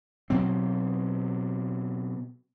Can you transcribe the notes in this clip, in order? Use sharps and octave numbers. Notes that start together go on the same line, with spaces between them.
B2 F#3 C4